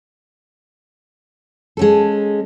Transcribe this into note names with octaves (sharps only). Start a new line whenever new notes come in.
G#3 C#4 A4